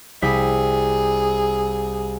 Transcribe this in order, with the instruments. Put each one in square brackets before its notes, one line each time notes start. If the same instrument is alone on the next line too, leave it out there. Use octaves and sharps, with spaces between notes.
[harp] C2 B6 [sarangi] G#4